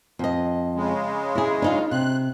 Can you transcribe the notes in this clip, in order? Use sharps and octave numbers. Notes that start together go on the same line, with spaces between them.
F2 D#5
C#3 G#3
E4 G#4
D4 D#4 F4
C3 F#6